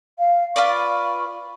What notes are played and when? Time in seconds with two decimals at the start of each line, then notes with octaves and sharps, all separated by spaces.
0.19 F5
0.56 F4 B4 D5 C#6